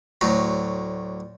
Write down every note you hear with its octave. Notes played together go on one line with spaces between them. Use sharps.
D2 A2 F#3